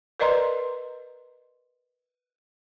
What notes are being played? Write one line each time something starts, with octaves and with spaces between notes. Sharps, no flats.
A#4 B4 D5 D#5 A#5 C6